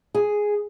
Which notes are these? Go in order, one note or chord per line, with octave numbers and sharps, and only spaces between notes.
G#4